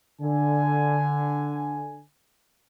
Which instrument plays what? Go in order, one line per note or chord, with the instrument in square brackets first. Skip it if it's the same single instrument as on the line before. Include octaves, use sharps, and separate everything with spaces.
[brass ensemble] D3 G#5